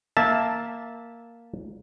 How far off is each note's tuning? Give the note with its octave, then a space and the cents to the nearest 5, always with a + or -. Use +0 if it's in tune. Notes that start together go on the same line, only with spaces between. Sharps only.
A#3 +0 E5 -10 A5 +0